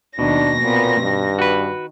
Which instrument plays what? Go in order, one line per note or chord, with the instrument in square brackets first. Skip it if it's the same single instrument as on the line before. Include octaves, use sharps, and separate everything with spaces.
[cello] D#2 D#3 [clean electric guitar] B2 [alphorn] D4 [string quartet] A#6
[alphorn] A#2 [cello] B3 C4
[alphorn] G2 [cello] D#3
[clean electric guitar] F#4 B4